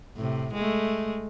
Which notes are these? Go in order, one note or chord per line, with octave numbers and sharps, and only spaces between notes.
A2 C3
G#3 A3